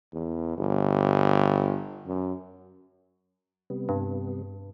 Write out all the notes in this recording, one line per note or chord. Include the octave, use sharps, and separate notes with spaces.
E2
G1
F#2
C3 G3 B3
G2